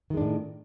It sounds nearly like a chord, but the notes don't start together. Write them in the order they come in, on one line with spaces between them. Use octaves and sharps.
D#3 G#3 D4 A2